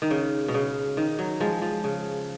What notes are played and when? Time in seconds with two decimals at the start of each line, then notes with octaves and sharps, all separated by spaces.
0.02 D#3
0.10 C#3
0.48 B2
0.54 C#3
0.97 D#3
1.19 F#3
1.40 F3 G#3
1.62 F3
1.84 C#3